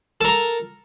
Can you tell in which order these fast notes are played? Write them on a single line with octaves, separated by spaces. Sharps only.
A4 A#4 A#5